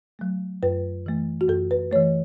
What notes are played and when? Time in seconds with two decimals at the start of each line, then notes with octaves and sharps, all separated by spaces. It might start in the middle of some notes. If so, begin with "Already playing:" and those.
0.19 F#3 A3
0.63 F#2 B4
1.06 E3 A3
1.41 F#4
1.48 F#2 A4
1.71 B4
1.91 E3 A3 C#5